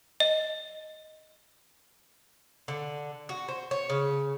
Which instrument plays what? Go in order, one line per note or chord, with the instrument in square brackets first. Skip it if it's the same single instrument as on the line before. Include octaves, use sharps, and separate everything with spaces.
[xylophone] D#5
[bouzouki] D3
F#4
C5
C#5
C#3